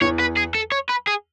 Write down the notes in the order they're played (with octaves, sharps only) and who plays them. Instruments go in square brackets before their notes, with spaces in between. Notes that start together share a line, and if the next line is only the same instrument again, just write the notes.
[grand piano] E2 E3 [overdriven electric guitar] C#5
[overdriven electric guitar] B4
G#4
A4
C#5
B4
G#4